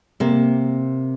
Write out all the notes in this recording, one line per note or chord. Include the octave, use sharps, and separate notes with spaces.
C3 A#3